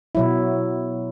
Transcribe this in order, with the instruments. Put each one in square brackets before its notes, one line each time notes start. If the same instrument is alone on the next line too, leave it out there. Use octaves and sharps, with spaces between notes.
[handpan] B2 F#3 E4